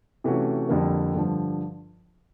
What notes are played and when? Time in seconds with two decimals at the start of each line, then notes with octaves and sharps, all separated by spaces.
0.24 C3 E3 A3 C#4 F#4
0.69 F2 D3 G3 A#3
1.15 G2 D3 F3